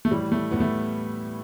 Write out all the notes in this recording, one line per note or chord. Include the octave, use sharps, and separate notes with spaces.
A3
A2 E3 G3
A3
A2 E3 B3
A3